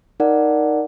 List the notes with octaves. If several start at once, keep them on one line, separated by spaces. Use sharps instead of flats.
D#4 A#4 D5 F#5